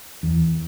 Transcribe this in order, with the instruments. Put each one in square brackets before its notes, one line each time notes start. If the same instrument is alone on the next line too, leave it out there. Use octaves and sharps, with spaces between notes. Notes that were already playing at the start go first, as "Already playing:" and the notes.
[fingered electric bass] E2